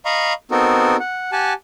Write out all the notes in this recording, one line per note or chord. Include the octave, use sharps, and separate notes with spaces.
D#5 F5 A#5 B5 C#6
B3 C4 D#4 F#4 A4 A#4
F#5
G4 F#5 G#5 A5